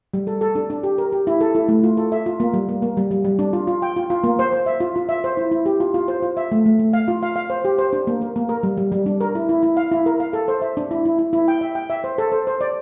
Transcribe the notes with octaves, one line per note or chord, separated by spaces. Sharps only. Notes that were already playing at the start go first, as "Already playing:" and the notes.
G3
A4
A4
D4
D4
G4
A#4
G4
E4
A4
E4
A3
F4
A4
E5
F4
A#3
G3
A#3
A#3
G3
G3
G3
D4
F4
F4
G5
F4
F4
A#3
C5
C5
E5
F4
F4
E5
C5
E4
E4
G4
F4
F4
C5
F4
E5
A3
A3
A3
F5
F4
F5
F5
C5
G4
C5
D4
A#3
A#4
A#3
A#4
G3
G3
G3
D4
A#4
E4
E4
E4
F5
E4
A#4
F5
A4
C5
E5
D4
E4
E4
E4
E4
G5
E5
G5
E5
C5
A4
C5
C5
D5